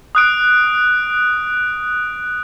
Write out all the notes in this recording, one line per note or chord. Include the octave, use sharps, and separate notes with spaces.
D#6 F#6 D7